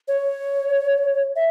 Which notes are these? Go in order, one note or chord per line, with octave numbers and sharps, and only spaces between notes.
C#5
E5